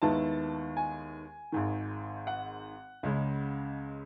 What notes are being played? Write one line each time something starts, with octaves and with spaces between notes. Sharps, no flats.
D#2 D#3 G#3 B3 E4 A5
G#5
G#1 G#2 D#3
F#5
C#2 C#3 G#3